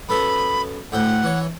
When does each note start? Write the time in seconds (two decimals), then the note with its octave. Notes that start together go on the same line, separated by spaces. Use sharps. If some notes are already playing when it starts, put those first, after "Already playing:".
0.09 F#2 B3 A4 B5
0.92 D2 A2 F#5 G5
1.23 E3 C#5